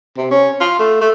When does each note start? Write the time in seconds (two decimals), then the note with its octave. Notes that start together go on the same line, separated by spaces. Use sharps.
0.17 C3
0.31 C#4
0.60 F4
0.79 A3
1.01 A3